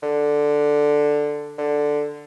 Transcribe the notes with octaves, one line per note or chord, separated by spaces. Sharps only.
D3
D3